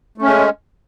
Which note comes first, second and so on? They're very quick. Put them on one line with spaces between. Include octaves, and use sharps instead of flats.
A3 C#4 G#3